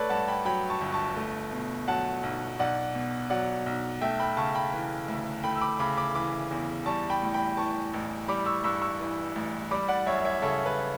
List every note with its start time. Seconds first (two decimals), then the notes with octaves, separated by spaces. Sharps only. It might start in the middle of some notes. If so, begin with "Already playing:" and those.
Already playing: A3 A4 B4 C#5 D5
0.09 G2 F#5 A5
0.28 G5 B5
0.45 F#3 G5 B5
0.70 A5 C#6
0.81 G1
0.93 A5 C#6
1.17 A3
1.52 B2
1.88 F#3 F#5 A5
2.23 B1
2.59 B1 D5 F#5
2.95 B2
3.30 F#3 D5 F#5
3.66 B1
4.01 A3 E5 G5
4.20 G5 B5
4.37 C#3 A5 C#6
4.55 G5 B5
4.73 E3
5.08 D2
5.43 A3 G5 B5
5.56 E6
5.61 B5 D6
5.79 C#3 B5 D6
5.97 B5 D6
6.15 E3 B5 D6
6.51 E2
6.86 G3 A5 C#6
7.10 G5 B5
7.22 A2
7.34 G5 B5
7.57 E3 A5 C#6
7.94 A1
8.28 G3 B5 D6
8.46 C#6 E6
8.64 G2 C#6 E6
8.82 C#6 E6
9.00 E3
9.36 A1
9.71 G3 B5 D6
9.88 D5 F#5
10.06 F#2 C#5 E5
10.25 C#5 E5
10.42 C#3 A4 C#5
10.66 B4